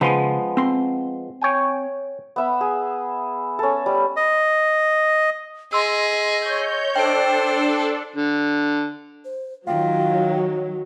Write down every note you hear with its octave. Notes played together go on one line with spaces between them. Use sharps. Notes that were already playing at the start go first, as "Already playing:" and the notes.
C#3 F3 G#3 B3 C6
C4 C6
C#5 G5 G#5
B3 E5 B5
G#4
C#4 A4
G3
D#5
G#4 D#5 C6 E6
C#5 G6
D4 A4 C5 G5 D7
D3
C5
D#3 F#3 F4 G5